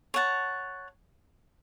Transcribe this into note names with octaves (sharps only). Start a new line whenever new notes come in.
C#5 F#5 A5